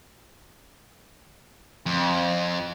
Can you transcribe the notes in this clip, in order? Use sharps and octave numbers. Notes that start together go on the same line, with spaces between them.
F2